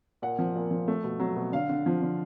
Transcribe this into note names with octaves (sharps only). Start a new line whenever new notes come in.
A#2 F#5
F3
A#2
F3
A3
B2
F#3
B2
D3 F5
D3
F3
D3